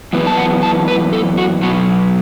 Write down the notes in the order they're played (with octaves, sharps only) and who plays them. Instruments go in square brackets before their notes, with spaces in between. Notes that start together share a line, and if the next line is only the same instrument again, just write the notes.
[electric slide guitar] F#2 E3 B3
A5
F#5
A5
B4
A4
F#4
B2 F#3 B3 F#4